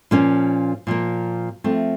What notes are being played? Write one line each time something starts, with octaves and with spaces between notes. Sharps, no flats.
A#2 F3 A#3 C#4
A#2 F3 A#3
F3 A3 C4